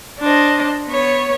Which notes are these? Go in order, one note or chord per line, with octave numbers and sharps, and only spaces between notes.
D4 C5 D#5
B3 C#5